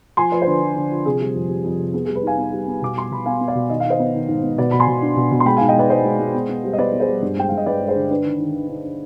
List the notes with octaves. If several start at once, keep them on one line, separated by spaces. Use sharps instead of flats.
F3 G#5 C6
F3 B4 D5
C5
D3 B4
F3
D3
F3
C3 G#4
G3
F2
G3
F2
C3
B3 G#4
G#4
G3
B4
D#4 F5 G#5
B3
G3
B3
B2 D6
G3 C6
B2 B5
B3 F5 G#5
B3
D5 F5
B2
D#3 D#5
D#3 F5
C5 D#5
B3
D#3
G#2
B3
B2 B4 D5
B2 B5
G#5 C6
B2
D4
B2
B2
C6
G#3 G5 B5
F5 G#5
G#2
D#5 G5
G#2 B4 D5
G#2 C5 D#5
G#3
G#3
B3
B3
G3
D#5
B3 B4 D5
B3
G#4 C5
G3
G2
G#3 G5
G2 F5
D#5
G2 B4 D5
G#3
G#4 C5
D3
D4 B4
D#3
D#3
D#3
D4
D4